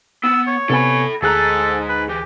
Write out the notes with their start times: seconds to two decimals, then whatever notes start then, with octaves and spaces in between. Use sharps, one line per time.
0.24 B3 E6
0.48 C#5
0.70 C3 B3 A4 G#5 B5
1.22 D2 G#2 G#4 A4 A#5 F#6
1.89 B4
2.09 E3 G4